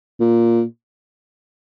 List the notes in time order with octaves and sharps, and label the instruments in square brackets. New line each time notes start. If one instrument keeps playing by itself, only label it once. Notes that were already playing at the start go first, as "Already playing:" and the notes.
[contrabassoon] A#2